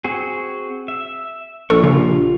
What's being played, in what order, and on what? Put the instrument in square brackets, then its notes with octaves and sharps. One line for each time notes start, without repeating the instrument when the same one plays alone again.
[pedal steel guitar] C4 F#4 G#4
E5
[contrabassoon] A#1 [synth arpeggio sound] A4 [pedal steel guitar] C#6
[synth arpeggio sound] C#3 [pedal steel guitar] F4 G4